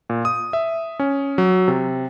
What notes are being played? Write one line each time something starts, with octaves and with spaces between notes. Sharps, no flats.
A#2
D#6
E5
C#4
F#3
C3